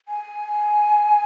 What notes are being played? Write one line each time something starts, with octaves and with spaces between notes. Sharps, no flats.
G#5